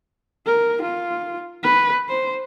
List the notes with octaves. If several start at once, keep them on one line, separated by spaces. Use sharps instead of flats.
A#4
F4
B4
C5